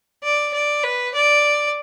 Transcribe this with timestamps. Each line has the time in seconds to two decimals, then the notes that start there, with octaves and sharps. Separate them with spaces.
0.23 D5
0.53 D5
0.83 B4
1.14 D5